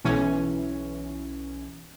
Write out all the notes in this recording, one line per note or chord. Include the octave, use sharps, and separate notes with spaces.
B1 E3 C#4